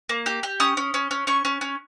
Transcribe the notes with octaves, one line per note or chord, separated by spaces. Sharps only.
A#3
G4
G4
C#4 D#6
C#4
C#4
C#4
C#4 C#6
C#4
C#4